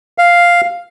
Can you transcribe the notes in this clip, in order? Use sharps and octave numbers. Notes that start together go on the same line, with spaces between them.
F5